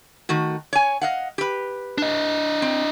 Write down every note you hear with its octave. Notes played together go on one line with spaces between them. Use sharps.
D#3 A3 F#4
C#5 G#5
D#5 F5 F#5
G4 B4
D4 D#5
C4